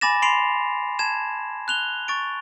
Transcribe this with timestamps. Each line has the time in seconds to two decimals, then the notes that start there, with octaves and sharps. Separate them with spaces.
0.01 G#5 B5 D6 A6 A#6 E7
0.22 B5 C6 C7 D7 F7
0.99 A5 G#6 E7
1.68 F#6 F7 G7
2.08 C#6 A6 D7